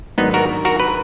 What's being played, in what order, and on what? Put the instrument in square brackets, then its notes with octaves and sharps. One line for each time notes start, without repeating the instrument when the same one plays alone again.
[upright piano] G#2 D#3 F#3 D4 [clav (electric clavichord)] B3 D#4
[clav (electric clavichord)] F#4 A#4
F#4 A#4
B4